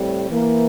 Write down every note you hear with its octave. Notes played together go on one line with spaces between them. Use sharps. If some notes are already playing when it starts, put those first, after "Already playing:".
Already playing: A2 G3 C4
E3 A#3